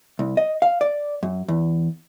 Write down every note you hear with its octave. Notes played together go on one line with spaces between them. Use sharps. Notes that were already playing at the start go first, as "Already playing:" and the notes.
C2
D#5
F5
D5
F#2
E2